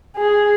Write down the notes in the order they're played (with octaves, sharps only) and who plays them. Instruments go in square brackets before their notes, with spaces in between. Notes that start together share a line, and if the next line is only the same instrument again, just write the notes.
[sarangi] G#4